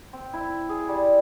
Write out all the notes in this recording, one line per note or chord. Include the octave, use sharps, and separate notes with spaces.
C4
E4
G#4
G3